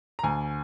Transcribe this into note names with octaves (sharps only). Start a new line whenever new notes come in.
A#5
D2 G#5